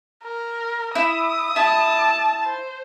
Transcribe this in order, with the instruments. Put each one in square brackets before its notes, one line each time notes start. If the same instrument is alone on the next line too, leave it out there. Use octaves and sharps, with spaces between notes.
[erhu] A#4
[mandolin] E4 [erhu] D#6
[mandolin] E4 [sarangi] A5
[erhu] C5